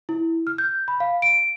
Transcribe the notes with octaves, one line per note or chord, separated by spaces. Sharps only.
E4
F6
G6
B5
F5
D7